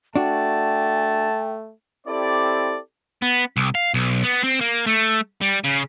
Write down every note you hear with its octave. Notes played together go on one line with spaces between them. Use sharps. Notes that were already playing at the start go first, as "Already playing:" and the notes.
A3 D4 F#4 G5 A5
C4 E4 G4 A4 D5
B3
C2
F5
B1
B3
C4
A#3
A3
G3
C#3